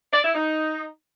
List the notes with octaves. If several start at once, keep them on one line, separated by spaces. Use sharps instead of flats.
D5
E4
D#4